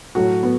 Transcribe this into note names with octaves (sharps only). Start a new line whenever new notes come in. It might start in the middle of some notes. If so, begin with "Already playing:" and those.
A2 F#3 A3 F#4
B3